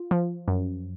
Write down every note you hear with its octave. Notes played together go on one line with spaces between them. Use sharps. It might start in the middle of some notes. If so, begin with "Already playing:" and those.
Already playing: F4
F3
F#2